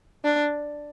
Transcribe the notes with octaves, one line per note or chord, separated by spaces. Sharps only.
D4